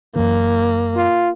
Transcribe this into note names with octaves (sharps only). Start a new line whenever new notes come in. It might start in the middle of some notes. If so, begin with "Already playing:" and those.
F#2 E3 A#3
F4